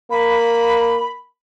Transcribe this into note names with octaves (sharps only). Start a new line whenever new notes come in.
A#3 B5